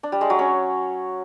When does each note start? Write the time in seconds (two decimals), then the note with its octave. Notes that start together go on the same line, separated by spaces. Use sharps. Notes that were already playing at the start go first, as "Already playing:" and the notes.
0.03 D4
0.12 G3
0.21 G#3
0.30 F#3
0.39 C#4